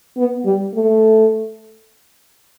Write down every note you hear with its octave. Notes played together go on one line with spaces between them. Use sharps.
B3
G3
A3